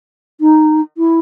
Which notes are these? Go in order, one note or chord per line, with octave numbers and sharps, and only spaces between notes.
D#4
E4